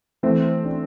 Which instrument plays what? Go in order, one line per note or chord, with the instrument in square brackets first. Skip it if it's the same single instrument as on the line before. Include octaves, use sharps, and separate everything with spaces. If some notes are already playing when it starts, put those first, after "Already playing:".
[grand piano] E3 [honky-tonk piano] A3 C4
[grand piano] D4